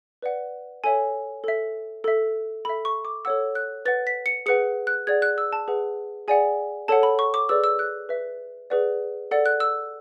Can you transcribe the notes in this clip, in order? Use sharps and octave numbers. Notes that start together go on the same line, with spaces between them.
B4 D5 F#5
A4 C#5 E5 G#5
A4 E5
A4 E5
A4 E5 B5
C#6
D6
A4 C#5 F#5 E6
F#6
B4 F#5 A6
B6
C#7
G#4 B4 F#5 C#7
F#6
G#4 D5 F#5 G#6
F#6
E6
A5
G#4 B4 F#5
G#4 D5 F#5 G#5
A4 C#5 F#5 A5
B5
C#6
D6
G#4 B4 D5 E6
E6
F#6
B4 E5
G#4 B4 D5 F#5
A4 D5 F#5
F#6
E6